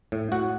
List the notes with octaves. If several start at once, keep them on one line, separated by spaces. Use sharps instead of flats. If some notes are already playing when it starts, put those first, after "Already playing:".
A2
A2 F#4 F#5